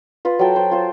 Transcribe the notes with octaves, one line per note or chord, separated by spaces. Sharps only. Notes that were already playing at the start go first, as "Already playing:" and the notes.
F4 B4
F#3 A4 G5 A5
C5
F4 C5